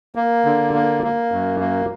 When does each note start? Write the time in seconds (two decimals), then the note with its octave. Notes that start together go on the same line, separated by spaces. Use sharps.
0.15 A#3
0.45 D3
0.74 A#3
1.03 A#3
1.32 F#2
1.60 A#3